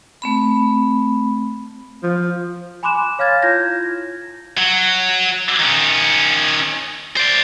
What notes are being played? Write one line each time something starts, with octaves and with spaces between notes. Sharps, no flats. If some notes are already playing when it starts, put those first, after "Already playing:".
A3 C4 B5
F3
G#5 B5 C6 D6 F#6 E7
C#5 F5 F6 G#6 A6
E4 F4 G6 G#6 A#6
F#3
D#3 C#4
C5 D5